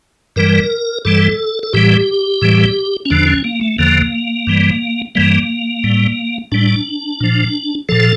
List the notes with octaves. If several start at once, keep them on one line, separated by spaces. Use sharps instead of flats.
G2 E3 G3 A#4
G2 E3 G3 A4
A4
A2 E3 G3 G4
A2 E3 G3
C#4
E2 D3 F3 D4
C#4
A#3
A3
E2 D3 F3 A#3
G2 E3 G3
G2 E3 G3 A#3
A2 G3
A2 G3 D4
A#2 F3
A#2 F3 A4